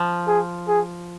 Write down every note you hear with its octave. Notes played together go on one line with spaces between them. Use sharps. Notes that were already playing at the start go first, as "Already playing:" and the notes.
Already playing: F3
G#4
G#4